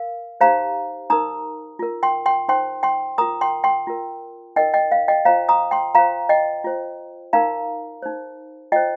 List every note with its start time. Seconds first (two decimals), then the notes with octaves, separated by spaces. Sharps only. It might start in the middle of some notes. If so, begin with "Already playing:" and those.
Already playing: A#4 F5
0.41 D#4 G4 C5 F5 A#5
1.10 D#4 A#4 A#5 D#6
1.79 F4 A#4
2.03 G5 C6
2.26 G5 C6
2.48 D#4 C5 G5 C6
2.83 G5 C6
3.18 F4 A#4 A#5 D#6
3.41 G5 C6
3.64 G5 C6
3.87 F4 A#4
4.56 D#4 A#4 D#5 G5
4.74 D#5 G5
4.92 F5
5.08 D#5 G5
5.25 F4 C5 F5 A#5
5.49 A#5 D#6
5.71 G5 C6
5.95 F4 C5 F5 A#5
6.29 D#5 G5
6.64 F4 C5
7.33 D#4 A#4 F5 A#5
8.02 D#4 C5
8.72 F4 C5 D#5 G5